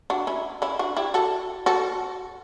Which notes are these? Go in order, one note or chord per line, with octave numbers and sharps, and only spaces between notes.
D4 F#4
C#4 E4
C#4 E4
D4 F#4
E4 G4
F#4 A4
F#4 A4